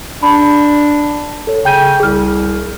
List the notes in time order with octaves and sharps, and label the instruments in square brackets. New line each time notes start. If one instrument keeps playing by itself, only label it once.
[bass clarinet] D4 [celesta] B5
[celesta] A4 C#5
[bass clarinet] C#3 [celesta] G5 G6 D#7
[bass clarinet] C2 [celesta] G#4 F6